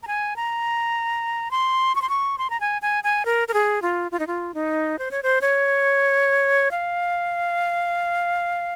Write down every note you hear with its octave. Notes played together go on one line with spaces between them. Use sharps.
A#5
G#5
A#5
C6
C#6
C6
C#6
C6
A#5
G#5
G#5
G#5
A#4
A#4
G#4
F4
F4
D#4
F4
D#4
C5
C#5
C5
C#5
F5